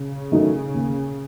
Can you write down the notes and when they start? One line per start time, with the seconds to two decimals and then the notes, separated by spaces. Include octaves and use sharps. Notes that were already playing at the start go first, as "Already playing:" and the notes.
Already playing: C#3
0.32 D#3 F#3 A3 D#4
0.74 D#2